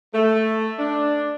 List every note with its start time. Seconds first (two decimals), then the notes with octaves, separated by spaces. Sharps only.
0.13 A3
0.78 D4